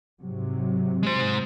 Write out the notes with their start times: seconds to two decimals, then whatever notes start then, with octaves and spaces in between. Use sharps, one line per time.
0.20 G#2 C3 F#3
1.03 G#3 C5